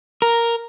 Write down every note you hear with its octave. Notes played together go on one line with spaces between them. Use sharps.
A#4